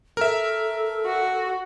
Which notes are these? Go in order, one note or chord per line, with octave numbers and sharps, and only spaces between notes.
A4 A#4 E5
F#4